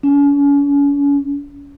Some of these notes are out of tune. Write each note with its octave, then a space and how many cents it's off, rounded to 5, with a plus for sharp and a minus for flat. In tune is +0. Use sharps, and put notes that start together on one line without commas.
C#4 +40